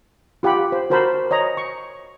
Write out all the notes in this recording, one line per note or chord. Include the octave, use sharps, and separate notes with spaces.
F4 G4 F#5 B5
C5
F#4 A#4 C5 A5 B5
C#5 D#5 A#5
C#6